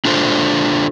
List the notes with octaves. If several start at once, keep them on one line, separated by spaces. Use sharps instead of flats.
D4 F4 A4 C5